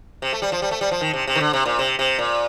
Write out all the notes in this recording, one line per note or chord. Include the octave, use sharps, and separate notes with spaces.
C3
A3
G3
F3
G3
A3
G3
F3
D#3
C3
C3
D#3
D3
C3
A#2
C3
C3
A#2